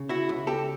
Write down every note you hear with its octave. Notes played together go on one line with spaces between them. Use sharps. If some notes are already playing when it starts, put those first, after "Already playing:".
Already playing: C#3
E4 F#4
C#2
G4 A4